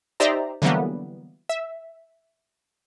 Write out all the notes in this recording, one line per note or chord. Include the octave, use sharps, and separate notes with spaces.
D#4 G4 C5 D5 E5 A#5
D3 E3 F#3 G3 A#3 B3
E5